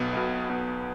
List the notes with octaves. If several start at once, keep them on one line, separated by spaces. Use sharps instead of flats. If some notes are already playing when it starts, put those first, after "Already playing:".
Already playing: B1 B2 B3
B1 B2
B1 B2